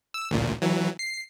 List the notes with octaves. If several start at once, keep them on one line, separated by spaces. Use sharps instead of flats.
E6
A1 D2 A#2
E3 F#3
C7